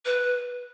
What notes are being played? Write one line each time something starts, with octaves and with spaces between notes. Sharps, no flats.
B4